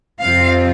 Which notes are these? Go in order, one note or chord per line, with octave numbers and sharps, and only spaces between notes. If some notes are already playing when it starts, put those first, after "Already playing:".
F2 C3 F3 C4 F4 F5